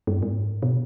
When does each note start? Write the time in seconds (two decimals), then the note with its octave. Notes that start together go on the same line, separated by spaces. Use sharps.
0.07 G2
0.23 G#2
0.63 B2